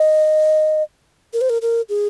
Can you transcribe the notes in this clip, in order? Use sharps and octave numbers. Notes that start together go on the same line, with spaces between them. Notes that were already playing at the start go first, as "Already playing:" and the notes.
Already playing: D#5
A#4
C5
A#4
A#4
G#4